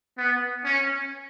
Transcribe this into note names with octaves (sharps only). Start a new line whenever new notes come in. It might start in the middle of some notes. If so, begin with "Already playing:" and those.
B3
C#4